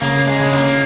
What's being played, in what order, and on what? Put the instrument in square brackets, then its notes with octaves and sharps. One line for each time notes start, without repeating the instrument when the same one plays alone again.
[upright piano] C#3 [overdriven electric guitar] A#3
[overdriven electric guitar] G#3
[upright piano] C#3
[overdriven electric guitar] A#3